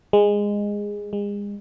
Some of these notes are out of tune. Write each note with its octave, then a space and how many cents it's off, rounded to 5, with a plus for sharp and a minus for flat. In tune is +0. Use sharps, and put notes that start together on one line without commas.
G#3 -15
G#3 -35